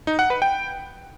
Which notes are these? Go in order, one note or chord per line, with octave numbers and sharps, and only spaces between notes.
D#4
F#5
B4
G5